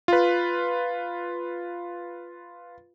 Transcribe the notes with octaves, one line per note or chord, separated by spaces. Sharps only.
F4 B4